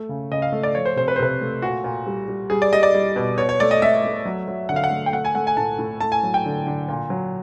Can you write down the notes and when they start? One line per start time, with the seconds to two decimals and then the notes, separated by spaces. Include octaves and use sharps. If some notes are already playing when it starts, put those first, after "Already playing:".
Already playing: A3
0.09 C#3
0.31 C#3 D#5
0.42 F5
0.52 A3
0.63 D5
0.75 F3 C#5
0.85 C5
0.96 C3 C5
1.08 B4
1.16 C5
1.19 C3 B4
1.41 A3
1.62 A#2 F#4
1.84 A#2
2.07 G3
2.28 G3
2.50 G3 G#4
2.62 D5
2.73 G3 D#5
2.83 D5
2.94 G3
3.16 B2
3.37 B2 C#5
3.49 C#5
3.60 A3 D5
3.71 D#5
3.82 A3 E5
4.04 A3
4.25 F#3
4.48 F#3
4.69 D3 F#5
4.76 F5
4.84 F#5
4.91 A3
5.06 G5
5.13 A3 F#5
5.25 G#5
5.35 A3 F#5
5.47 G#5
5.57 A2 A5
5.79 A2
6.00 A3 A5
6.12 G#5
6.23 F#3
6.34 G5
6.46 D3
6.67 D3
6.88 A#2
7.10 F#3